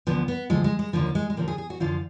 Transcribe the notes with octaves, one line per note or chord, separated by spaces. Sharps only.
D2 D3 F3 B3
B3
D2 D3 F3 G#3
G#3
G#3
D#2 D3 F3 A#3
G#3
G#3
D#2 D3 F3 A#3
G#4
G#4
F#4
F#2 D3 F3 F4